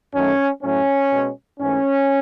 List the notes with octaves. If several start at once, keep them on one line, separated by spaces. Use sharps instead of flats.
F#2 D#3 F#3 A3 C#4
A2 F#3 A3 C#4
B2 G#3
G#2 E3 A3 C#4